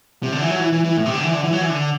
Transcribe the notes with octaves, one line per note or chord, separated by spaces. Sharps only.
C3
D3
E3
F#3
E3
E3
E3
A2
C3
D3
E3
D3
E3
F#3
E3
D3